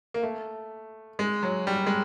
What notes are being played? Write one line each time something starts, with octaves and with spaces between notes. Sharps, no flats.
A#3
A3
G#3
F#3
G3
G#3